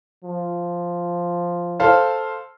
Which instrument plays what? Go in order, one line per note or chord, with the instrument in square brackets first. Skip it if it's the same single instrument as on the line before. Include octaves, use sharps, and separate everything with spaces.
[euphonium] F3
[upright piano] A4 C5 F5